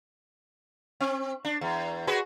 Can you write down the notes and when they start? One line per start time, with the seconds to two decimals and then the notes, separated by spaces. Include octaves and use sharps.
1.01 C4
1.45 D4
1.61 E2
2.07 F#4 G#4 B4